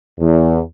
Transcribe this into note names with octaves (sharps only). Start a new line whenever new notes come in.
E2